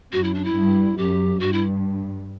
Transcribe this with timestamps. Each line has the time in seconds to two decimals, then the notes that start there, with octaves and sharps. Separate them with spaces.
0.13 F#2 F#4
0.24 E4
0.34 D4
0.44 E4
0.55 G2
0.97 F#2 G4
1.40 G2 F#4
1.53 E4